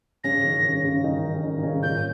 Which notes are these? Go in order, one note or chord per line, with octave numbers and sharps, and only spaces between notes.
C#3 C#4 A#6
D#3 D#4
C#3 C#4
C#3 C#4
D#3 D#4
C#4
D#3 D#4
D#4
C#3 C#4
A#2 A#3 G6